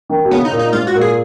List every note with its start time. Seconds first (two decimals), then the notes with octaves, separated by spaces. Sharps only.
0.09 D#3
0.25 B2
0.31 C#3 B3
0.45 D#4
0.51 A#2
0.59 D#4
0.73 G#2 F4
0.87 F#4
0.94 A#2
1.01 G#4